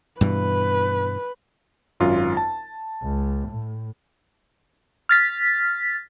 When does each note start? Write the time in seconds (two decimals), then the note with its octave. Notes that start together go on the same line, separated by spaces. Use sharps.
0.21 G2 B2 E3 B4
2.00 G#1 F#2 F4
2.37 A5
3.03 C#2
3.48 A2
5.09 F6 A6 B6